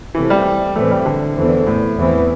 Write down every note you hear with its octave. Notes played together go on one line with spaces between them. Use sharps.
C3 E3 A3 C4
G3
A2 E3 A3 C4
G3
D3
E2 E3 A3 C4
A2
E2 E3 C4